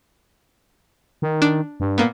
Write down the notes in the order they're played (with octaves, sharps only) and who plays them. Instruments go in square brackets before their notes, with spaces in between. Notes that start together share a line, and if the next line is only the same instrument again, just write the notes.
[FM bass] D#3
[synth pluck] D4
[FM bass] G2
[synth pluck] A#2 A#3 B3